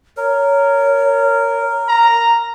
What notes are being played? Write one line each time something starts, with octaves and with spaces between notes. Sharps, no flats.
A#4 C#5
A#5